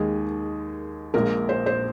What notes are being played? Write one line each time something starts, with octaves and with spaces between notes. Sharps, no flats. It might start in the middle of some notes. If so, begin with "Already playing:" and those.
Already playing: D#2 D#3 G#3 G#4
A#1 A#2 G#3 A#4
C5
C5